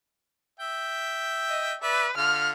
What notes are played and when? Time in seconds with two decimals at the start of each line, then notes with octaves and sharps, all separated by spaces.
0.60 E5 G5
1.50 D#5
1.81 B4 D5 E5
2.17 D3 F4 F6